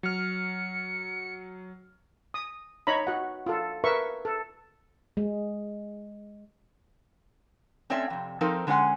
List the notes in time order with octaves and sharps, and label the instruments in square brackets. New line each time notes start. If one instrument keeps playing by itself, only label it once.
[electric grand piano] F#3 F6 [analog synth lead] C#7
[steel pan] D#6
D#4 C#5 A#5 B5
F#4 F#5
F4 A4
A#4 B4 E5 C#6
A4
[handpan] G#3
[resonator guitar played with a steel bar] A3 C4 C#4 C#5 D5 E5
F2 C3
F3 C4 D#4 A4 A#4 C5
D3 G#3 C#4 G#4 F#5 G#5